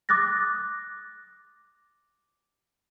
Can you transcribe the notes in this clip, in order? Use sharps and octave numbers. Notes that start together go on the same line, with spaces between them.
D6 D#6 F#6 A6 A#6